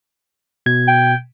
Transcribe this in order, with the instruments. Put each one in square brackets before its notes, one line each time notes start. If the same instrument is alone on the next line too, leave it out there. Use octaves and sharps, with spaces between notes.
[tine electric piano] B2 G#6
[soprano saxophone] G5